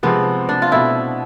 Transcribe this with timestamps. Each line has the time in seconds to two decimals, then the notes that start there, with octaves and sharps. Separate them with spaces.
0.03 C3 F3 G#3 B3 C4
0.49 D4
0.62 F4
0.71 B2 A3 C4 E4